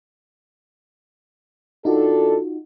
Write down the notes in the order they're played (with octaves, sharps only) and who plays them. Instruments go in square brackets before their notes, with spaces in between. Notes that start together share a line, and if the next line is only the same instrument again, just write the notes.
[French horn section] D#3 D4 A4 [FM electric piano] D#4 F4 F#4